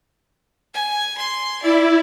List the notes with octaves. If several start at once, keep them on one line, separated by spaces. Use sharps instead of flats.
G#5
C6
E4 D5